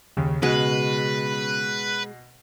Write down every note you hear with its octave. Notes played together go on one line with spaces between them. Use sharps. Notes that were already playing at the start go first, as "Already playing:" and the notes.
D#2 C#3
B2 G#3 B4